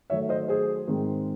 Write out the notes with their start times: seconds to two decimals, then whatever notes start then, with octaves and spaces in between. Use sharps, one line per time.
0.10 D#3 F#3 A3 C#5 E5
0.29 C5 D#5
0.48 G#4 C5
0.87 G#2 D#3 G#3 C4